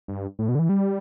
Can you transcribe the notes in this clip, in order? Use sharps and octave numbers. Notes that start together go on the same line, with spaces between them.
G2
A2
B2
D3
E3
G3